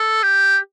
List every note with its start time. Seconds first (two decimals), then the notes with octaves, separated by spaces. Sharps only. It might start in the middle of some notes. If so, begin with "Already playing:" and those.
Already playing: A4
0.23 G4